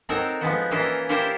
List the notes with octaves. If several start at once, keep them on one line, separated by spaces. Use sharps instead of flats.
C4 D#4 F#4 A4 A#4 C#5
F3 G#3 B3 F#4
E3 A#3 C#4 E4 F4 D#5
E4 F4 G4 A#4 C5 C#5